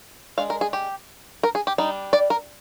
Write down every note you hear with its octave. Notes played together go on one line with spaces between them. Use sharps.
G#3 D4 F5
A#4
G#4
G4
A#4
G#4
G4
G3 D4 D#4
D5
A#4